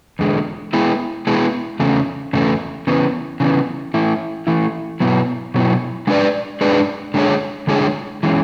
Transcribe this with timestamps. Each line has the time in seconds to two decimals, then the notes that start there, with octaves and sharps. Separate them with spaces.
0.19 E2 D3 G#3
0.73 G#3 B3 E4 G#4
1.27 G#3 B3 E4 G#4
1.80 E2 C#3 A3
2.33 E2 C#3 A3
2.87 C#3 E3 B3
3.40 C#3 E3 B3
3.94 E3 A3 E4
4.47 E3 A3 E4
5.00 B2 F#3 B3 E4
5.54 B2 F#3 B3 E4
6.07 G#3 D4 G#4 B4 D5
6.61 G#3 D4 G#4 B4 D5
7.14 D3 G#3 D4 G#4 C#5
7.67 D3 G#3 D4 G#4 C#5
8.23 E3 G#3 C#4